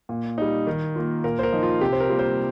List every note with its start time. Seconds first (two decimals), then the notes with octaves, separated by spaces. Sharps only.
0.09 A#2
0.38 G3 D#4
0.67 D#3
0.96 A#3 F4
1.24 A#2 A#4
1.39 C5
1.43 A#4
1.53 F3 D#4
1.63 F4
1.81 C3 G4
1.92 C5
2.00 A#4
2.10 G3 A#3 F4
2.19 C5